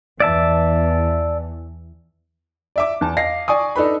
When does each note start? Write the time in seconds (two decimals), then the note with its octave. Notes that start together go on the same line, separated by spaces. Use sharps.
0.20 E2 E3 D5 E5 A5
2.76 D5 E5 D6
3.01 E2 A5
3.17 D#5 F5 A#6 C7
3.48 D5 G#5 C#6 D#6
3.76 D4 D#4 A4 B4 B5